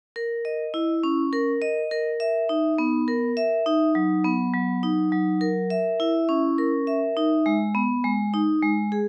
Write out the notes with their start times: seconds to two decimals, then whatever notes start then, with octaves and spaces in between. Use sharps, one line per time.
0.16 A#4
0.45 D#5
0.74 E4
1.03 C#4
1.33 A#4
1.62 D#5
1.91 A#4
2.20 E5
2.49 D#4
2.78 B3
3.08 A#4
3.37 E5
3.66 D#4
3.95 F#3
4.24 B3
4.54 F#3
4.83 D#4
5.12 F#3
5.41 A#4
5.70 E5
6.00 E4
6.29 C#4
6.58 A#4
6.87 E5
7.17 D#4
7.46 G#3
7.75 B3
8.04 G#3
8.34 D#4
8.63 G#3
8.92 G#4